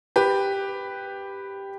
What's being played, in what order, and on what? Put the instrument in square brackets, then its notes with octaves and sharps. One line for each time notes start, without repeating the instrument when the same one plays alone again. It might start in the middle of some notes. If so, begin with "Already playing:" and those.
[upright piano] G4 B4